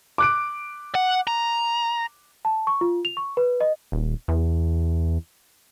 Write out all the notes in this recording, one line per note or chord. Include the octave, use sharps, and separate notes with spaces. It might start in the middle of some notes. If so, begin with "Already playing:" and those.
D6 F#6 D7
F#5
A#5
A5
C#6
F4
F7
C#6
B4
D#5
D#1
E2